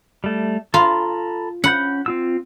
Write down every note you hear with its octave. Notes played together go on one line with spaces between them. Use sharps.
G3 A3
F4 A4 A#5 B5
C#4 F#5 B5 G6
C4 F4 E6